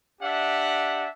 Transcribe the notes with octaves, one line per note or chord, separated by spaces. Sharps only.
D4 G4 E5 F#5